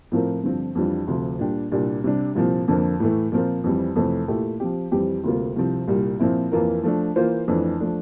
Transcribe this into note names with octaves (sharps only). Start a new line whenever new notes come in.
A2 F3 C4 F4 A#4
G2 D3 F3 C4 F4
F2 E3 G3 D4 F4
D2 C3 F3
A#2 G3 D4 G4
C2 A#2 G3 D4
C3 G3 D4
C2 A#2 F3 C4
F2 D3 F3 A#3
A2 E3 A3
A#2 F3 C4 F4 A#4
F2 E3 G3 C4
F2 C3 E3 A3
A#2 A3 E4 G4
F3 C4 G4
F2 E3 G3 C4 G4
D2 C3 G3 A#3 F4
C2 C3 F3 C4
C2 A#2 G3
A#2 F3 C4 E4
F2 E3 A#3 F4 A#4
F3 A3 D4
E3 A#3 F4 C5
F2 E3 A3 D4
F3 A3 D4